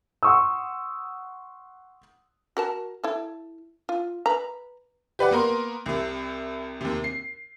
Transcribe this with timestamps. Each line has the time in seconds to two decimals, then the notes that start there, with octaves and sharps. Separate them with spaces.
0.23 F#5 C6 C#6 D#6 E6
2.57 F#4 A#4 A5
3.04 E4 A4
3.89 F4
4.26 B4 A#5
5.19 G4 B4 D5 F#5
5.31 A#3 B3 A#4 C6
5.86 C2 C3
6.81 D#2 C3
7.04 C7